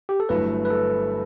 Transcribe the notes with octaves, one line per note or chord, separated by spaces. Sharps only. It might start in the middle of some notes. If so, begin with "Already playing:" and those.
G4
A4
G1 G2 F#3 A3 E4 B4
B4
A4